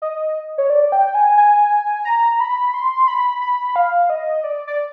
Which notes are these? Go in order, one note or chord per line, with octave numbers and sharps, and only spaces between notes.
D#5
C#5
D5
G5
G#5
G#5
A#5
B5
C6
B5
B5
F5
D#5
D5
D5